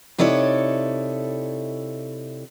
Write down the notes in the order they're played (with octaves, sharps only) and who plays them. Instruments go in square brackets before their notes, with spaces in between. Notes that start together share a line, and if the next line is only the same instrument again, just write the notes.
[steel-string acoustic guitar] C3 D#4 E4 A4 C#5 D5